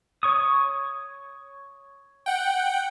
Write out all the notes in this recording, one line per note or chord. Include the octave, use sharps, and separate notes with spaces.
C#5 C#6 D#6
F#5 G5